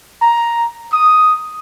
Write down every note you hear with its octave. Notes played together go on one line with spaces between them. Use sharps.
A#5
D#6